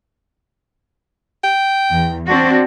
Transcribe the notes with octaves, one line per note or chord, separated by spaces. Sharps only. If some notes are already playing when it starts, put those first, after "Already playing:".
G5
E2
C4 D4 F#4